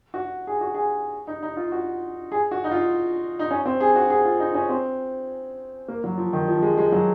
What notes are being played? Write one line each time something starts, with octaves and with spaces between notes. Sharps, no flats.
F#4
G#4
F#4
G#4
D#4
D#4
F4
F#4
G#4
F#4
D#4
F4
D#4
C#4
C4
G#4
F#4
G#4
F4
D#4
C#4
C4
A#3
F#3
F3
D#3
F3
G#3
G#3
F#3